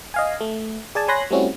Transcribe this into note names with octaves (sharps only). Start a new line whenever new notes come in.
D#5 F5 G#5
A3
G#4 D5 G#5 A5
C#5 G#5 B5 C6 F#6 A#6
G3 A3 C4 C#4 E4 F#4